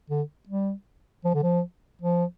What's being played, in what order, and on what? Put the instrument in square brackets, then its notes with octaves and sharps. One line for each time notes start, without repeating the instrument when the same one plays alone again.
[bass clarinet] D3
G3
F3
D3
F3
F3